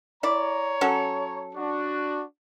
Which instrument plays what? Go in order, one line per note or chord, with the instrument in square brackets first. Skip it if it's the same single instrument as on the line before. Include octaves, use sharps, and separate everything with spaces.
[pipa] E4 D5 [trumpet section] C#5 A#5
[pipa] F#3 C#4 A4
[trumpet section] D4 F#4